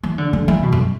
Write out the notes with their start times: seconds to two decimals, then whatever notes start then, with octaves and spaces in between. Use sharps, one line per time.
0.03 E3
0.18 D3
0.33 D3
0.48 E3
0.63 B2
0.72 F#2